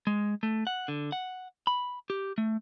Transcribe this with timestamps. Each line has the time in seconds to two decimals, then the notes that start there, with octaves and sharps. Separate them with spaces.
0.07 G#3
0.43 A3
0.67 F#5
0.88 D3
1.12 F#5
1.67 B5
2.10 G4
2.38 A3